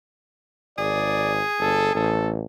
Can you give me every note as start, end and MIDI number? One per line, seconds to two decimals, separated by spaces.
0.78 1.41 32
0.78 2.12 68
0.78 1.36 74
1.60 1.91 31
1.60 1.94 69
1.95 2.46 33
1.95 2.32 69